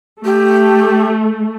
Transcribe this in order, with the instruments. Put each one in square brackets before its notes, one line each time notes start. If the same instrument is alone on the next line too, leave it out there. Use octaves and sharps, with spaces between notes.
[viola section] A3 [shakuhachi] G4